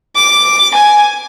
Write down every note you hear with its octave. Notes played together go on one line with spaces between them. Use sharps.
D6
G#5